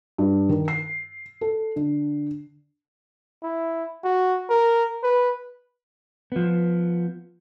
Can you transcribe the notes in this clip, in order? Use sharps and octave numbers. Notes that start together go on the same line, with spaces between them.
G2
D#3
C7
A4
D3
E4
F#4
A#4
B4
F3 B3